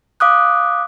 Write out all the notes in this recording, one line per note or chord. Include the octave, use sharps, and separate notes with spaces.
F5 D6 D#6 F#6